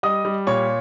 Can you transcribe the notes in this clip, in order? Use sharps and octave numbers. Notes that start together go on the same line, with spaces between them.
G3 D#5 D#6
G3
A#2 C#5 C#6